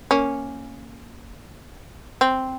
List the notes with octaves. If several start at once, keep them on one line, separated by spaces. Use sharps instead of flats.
A#3 C#4
C4